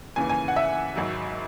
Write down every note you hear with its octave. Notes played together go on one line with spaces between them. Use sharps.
D#2 C#3 E3 G#5
G#5
F#5
E5
G#1 G#2 F#3